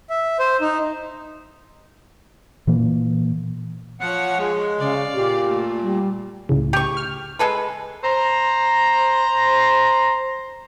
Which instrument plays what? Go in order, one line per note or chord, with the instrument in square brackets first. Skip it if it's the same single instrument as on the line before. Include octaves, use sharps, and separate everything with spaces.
[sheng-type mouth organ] E5
C5
D#4
[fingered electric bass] A#2 E3 A#3
[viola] F3 C#5 [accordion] F#5
[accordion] G#3
[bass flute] C#3 [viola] D5 F5
[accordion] A#2 [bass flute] G4
[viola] A3
[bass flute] G3
[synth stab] C#2 A2 C#3
[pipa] G4 C#6
[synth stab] F6
[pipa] G#3 A4 B4
[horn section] C5 A#5